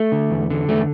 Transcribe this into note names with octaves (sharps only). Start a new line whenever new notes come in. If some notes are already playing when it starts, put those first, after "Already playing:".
Already playing: A3
D3
E2
D3
E2 A3